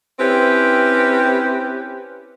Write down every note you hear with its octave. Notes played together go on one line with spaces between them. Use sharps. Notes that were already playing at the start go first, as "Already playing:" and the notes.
C4 C#4 E4 G4 B4